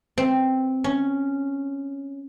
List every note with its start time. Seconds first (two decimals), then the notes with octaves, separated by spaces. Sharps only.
0.18 C4
0.84 C#4